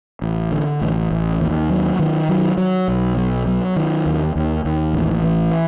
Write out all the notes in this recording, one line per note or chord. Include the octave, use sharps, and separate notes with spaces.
A1
D3
A1
A1
D#2
F#3
D#3
F#3
F#3
B1
F#3
F#3
D#3
D#2
D#2
D#2
A1
E3